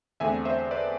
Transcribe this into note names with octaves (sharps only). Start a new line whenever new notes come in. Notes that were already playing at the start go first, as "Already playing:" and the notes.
E2 D3 A3 C4 E5 G#5
C5 E5
B4 D5